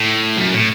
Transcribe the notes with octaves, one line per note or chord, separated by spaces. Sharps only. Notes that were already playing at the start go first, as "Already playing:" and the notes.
Already playing: A2
F#2
A2